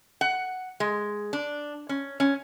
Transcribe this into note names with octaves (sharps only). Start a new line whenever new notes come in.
F#5
G#3
D4
C#4
C#4